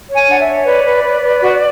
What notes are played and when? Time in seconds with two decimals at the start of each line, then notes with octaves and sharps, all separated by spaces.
0.09 C#5
0.15 G#5
0.28 D4 F#5
0.40 E5
0.47 C#5
0.65 B4 D5
0.84 B4
1.03 B4
1.23 B4
1.42 F#4